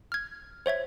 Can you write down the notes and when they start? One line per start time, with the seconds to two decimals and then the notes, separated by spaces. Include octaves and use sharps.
0.12 F6 G#6
0.66 C5 C#5 E5 G#6